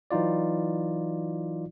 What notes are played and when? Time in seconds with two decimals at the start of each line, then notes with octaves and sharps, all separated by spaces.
0.11 E3 F#3 D#4 F4 D5